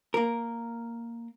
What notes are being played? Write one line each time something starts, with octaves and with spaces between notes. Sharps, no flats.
A#3 A#4